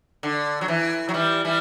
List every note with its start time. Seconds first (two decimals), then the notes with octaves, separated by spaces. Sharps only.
0.23 D3
0.61 F#3
0.68 E3
1.09 F#3
1.14 E3 G3
1.45 E3 G3